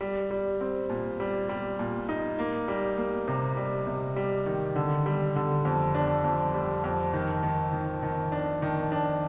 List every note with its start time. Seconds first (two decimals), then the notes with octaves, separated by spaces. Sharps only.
0.01 G3
0.31 G3
0.61 C4
0.89 A#2
1.20 G3
1.49 G3
1.79 A#2
2.09 D#4
2.39 A#3
2.68 G3
2.98 A#3
3.28 C3
3.57 G3
3.87 C3
4.16 G3
4.46 D#3
4.76 D3
5.06 G3
5.36 D3
5.65 F2
5.95 D4
6.24 F2
6.54 G3
6.84 F2
7.13 D#3
7.43 D#3
7.73 D#3
8.03 D#3
8.32 D4
8.62 D#3
8.92 D4